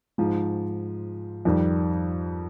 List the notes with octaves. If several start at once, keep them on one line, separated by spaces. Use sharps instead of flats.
G#2 F3 G#3
F2 D#3 G3